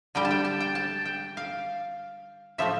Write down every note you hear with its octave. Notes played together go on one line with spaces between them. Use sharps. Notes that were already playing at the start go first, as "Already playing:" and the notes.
D3 G3 G5
A5
G5
A5
G5
A5
G5
F5
A2 F3 A3 E5